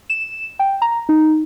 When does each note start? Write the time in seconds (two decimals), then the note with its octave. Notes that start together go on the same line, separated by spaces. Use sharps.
0.10 E7
0.59 G5
0.82 A#5
1.09 D#4